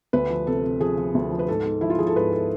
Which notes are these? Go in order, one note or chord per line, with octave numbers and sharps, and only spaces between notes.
D2 B4
F3
C3 A4
C3
F3 G#4
F3
D2
F3
B4
G#2 A4
G#2
F3 E4
F4
F3 G#4
A4
G#2 B4
A4